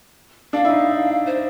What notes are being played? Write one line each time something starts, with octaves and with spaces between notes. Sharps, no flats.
D4 F5
E4
D#4
C5